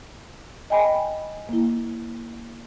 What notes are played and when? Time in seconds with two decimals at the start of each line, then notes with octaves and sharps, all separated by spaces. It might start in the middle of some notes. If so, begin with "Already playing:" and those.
0.70 D#5 G5 G#5 B5
1.49 A#3 E4